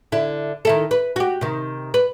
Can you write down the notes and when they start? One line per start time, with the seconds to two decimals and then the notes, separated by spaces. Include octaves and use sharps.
0.12 D3 E4
0.65 D#3 E4 A4
0.91 B4
1.16 F#4 G4
1.41 C3 D#3
1.94 B4